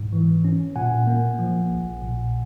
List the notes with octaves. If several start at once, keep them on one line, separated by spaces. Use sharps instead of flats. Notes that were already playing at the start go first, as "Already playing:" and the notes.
Already playing: G#2
E3
C#4
A#2 F#5 G#5
A#3
F3
A#1
A#2